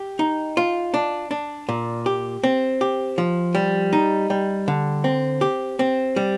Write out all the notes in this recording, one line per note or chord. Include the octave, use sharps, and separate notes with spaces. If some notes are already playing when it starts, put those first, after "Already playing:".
Already playing: G4
D#4
F4
D4
D4
A#2
G4
C4
G4
F3
G3
D#4
G3
D3
C4
G4
C4
G3